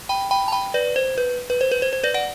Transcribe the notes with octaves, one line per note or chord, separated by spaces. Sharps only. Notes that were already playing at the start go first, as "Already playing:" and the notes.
G5 B5
G5 B5
A5
G5 B5
B4 D5
C5
B4
B4
C5
B4
C5
C5
B4 D5
D5 F#5